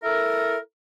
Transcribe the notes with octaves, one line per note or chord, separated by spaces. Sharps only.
E4 A4 A#4